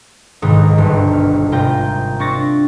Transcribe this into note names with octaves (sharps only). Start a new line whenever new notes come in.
B1 G#2 D#3 D#4
G1 D2
F6
G#1 C3 F4 G5 A#5
C4 D4 C#6 A6 A#6